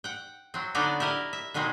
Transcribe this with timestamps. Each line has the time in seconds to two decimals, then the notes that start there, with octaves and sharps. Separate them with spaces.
0.04 F#5 G5
0.54 F#3 C4
0.75 D3 F#3 B3 D4 D#4 D5
1.00 E4 G4 A#4 D#5
1.33 E5
1.54 B2 D#3 F#3 G#3 C4